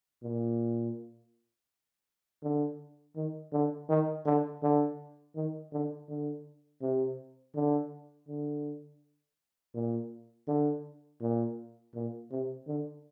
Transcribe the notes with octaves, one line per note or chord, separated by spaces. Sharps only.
A#2
D3
D#3
D3
D#3
D3
D3
D#3
D3
D3
C3
D3
D3
A#2
D3
A#2
A#2
C3
D3